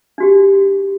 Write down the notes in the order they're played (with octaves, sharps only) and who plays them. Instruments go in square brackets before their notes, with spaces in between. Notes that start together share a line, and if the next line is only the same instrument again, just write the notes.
[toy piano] D4 F#4 G4